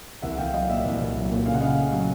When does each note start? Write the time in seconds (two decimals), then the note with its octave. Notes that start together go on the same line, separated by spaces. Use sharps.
0.22 C2 E5 F#5
0.38 C2 F5 G5
0.53 F#3 D#5 F5
0.69 A#2 D5 E5
0.85 C2
1.00 C2
1.16 F#3
1.31 A#2
1.46 C#3 F5
1.54 F#5
1.61 C#3 D#5 F5
1.78 A3
1.92 F#3